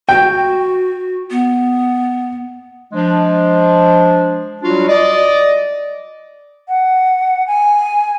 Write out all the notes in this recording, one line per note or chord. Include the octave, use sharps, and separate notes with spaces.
F#4 G5
B3
F3 G#3 D4
F#3 G3 D4 F4 F#4
D5 D#5
F#5
G#5